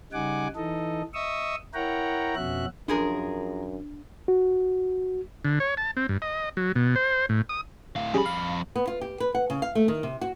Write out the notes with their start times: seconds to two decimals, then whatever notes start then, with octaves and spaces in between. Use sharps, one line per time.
0.13 C#3 G3 D#4 F#5 G#5 D6
0.56 E3 D#4 A4 D#5
1.14 D#5 E5 C#6 D#6 E6
1.74 E4 A#4 C#5 F#5 G5 A#5
2.36 F2 B2 C#4 F#4 E5 F#6
2.88 F#2 F3 D4 G#4 A#4
4.28 F#4
5.45 D3
5.60 C#5
5.77 A5
5.97 C4
6.09 G2
6.22 D#5
6.57 F#3
6.75 B2
6.96 C5
7.29 A2
7.49 D#6
7.96 A2 F5
8.14 F2 C#3 G3 G#4 B5
8.26 F5
8.76 B3
8.87 F4
9.01 G4
9.20 B4
9.35 F#5
9.50 C#3
9.62 F5
9.75 A3
9.88 D#3
10.03 C3
10.21 F#4